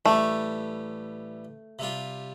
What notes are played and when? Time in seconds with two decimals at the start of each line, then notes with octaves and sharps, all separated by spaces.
0.05 A1 A2 G3 A3
1.79 C3 G3 F4